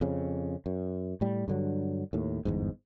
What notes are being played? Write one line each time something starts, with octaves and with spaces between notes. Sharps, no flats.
F2 C#3
F#2
A2 G3
G2 D3 F#3
D#2 A2
G1 E2 G#2